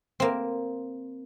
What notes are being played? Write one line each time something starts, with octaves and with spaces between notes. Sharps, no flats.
A#3 C4